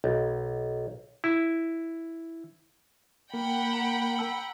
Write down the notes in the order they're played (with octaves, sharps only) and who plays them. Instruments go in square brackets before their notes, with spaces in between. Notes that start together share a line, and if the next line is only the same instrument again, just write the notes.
[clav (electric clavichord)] B1
E4
[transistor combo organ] A#3 [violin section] F#5 G5 B5
[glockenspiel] A#5
A5 E6